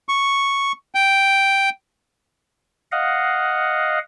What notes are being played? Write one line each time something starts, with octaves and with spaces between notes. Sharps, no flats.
C#6
G5
D#5 F5 F#5